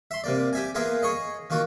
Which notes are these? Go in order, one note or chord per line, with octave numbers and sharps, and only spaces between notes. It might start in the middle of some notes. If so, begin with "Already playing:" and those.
E5 C6
C3 A#3 D5
G4 E5 G#5
A#3 B3 F4 G#4 A#4 E5
G#4 C#5 D#5
D#3 A#3 F4 F#4